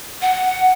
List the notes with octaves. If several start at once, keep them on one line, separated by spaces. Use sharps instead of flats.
F#5